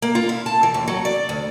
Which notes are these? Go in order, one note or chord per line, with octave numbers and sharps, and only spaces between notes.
A#3
F4
E4
A5
E3
D#2
F#3
D5
D2